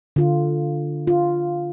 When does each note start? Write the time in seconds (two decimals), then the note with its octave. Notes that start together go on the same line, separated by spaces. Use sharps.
0.16 D3 F4
1.07 F4